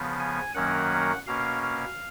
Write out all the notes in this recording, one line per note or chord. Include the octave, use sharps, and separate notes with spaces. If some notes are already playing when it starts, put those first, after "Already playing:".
Already playing: C#3 F3 B3
G#5
F#2 D#3 F#3 A#3 C#4 F#5
B2 A#3 C#4 F5
F5